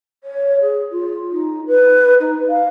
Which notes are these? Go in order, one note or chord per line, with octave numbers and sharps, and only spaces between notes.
C#5
G#4
F4
D#4
B4
D#4
F5